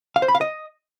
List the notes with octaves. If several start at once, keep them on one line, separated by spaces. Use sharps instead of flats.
F5
C5
B5
F5
D#5